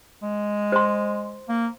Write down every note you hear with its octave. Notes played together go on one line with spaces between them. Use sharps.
G#3
C5 C6
A#3